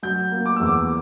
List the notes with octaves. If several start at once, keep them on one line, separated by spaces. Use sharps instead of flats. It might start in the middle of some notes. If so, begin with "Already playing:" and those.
F#3 G6
A#3
D6
E2 E6
D6